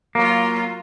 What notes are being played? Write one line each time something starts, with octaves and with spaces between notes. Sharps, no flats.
F#3 A#3 F4